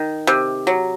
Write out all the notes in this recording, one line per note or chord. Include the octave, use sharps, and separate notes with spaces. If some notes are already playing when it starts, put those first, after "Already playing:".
Already playing: D#3
C3
F#3